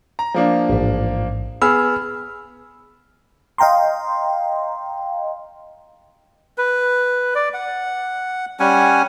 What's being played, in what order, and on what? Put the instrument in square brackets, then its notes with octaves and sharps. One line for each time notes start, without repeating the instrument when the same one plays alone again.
[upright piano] A#5
F3 A#3 D4
[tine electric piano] A1 G#2
[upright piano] B3 G#4 [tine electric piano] B5 E6 F6
[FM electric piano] D#5 F5 G5 A#5 C6
[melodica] B4
D5
F#5
G3 C#4 F#5 G#5